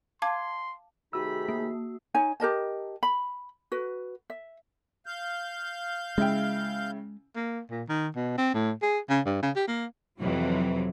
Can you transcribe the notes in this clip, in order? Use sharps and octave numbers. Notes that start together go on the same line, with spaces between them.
F5 A5 C6 D6 G#6
C3 D#3 A3 D#4 F#4 G#4 B5 E6
A#3
D#4 C#5 G#5
G4 A#4 D#5 A5
B5
F#4 B4
E5
F5 G6
C#3 G#3 E4 G5
A#3
A#2
D#3
B2
C4
A2
G#4
C#3
G2
C#3
G4
A#3
F2 C3 E3 F#3